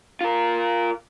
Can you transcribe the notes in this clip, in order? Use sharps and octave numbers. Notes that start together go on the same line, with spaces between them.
F4 A#4